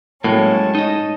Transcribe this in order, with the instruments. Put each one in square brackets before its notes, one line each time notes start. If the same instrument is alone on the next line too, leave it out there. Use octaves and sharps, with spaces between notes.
[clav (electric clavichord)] A2 [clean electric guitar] F#3 A#3 [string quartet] G#3 C#4 [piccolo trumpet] A5
[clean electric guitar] D#4 C#5 D#5